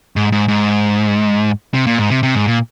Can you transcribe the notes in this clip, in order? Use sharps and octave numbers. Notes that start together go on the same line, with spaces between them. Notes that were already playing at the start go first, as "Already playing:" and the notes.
G#2
G#2
G#2
C3
A#2
G#2
C3
C3
G#2
A#2